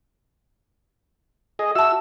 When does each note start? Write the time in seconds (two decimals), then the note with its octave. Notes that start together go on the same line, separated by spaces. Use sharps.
1.59 G#4 D#5
1.75 F#4 E5 A5 E6